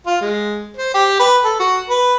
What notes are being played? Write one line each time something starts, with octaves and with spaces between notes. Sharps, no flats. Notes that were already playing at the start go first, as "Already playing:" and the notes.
F4
G#3
C5
G4
B4
A4
F#4
B4